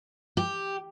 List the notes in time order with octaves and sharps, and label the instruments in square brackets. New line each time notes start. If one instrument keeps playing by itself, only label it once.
[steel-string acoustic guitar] G4